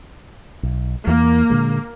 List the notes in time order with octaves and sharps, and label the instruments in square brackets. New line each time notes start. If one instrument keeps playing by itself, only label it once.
[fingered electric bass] B1
[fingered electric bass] E2 E3 [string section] A#3
[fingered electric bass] A#2 D3 G#3